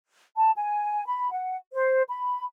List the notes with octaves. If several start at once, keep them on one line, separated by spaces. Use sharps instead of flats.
A5
G#5
B5
F#5
C5
B5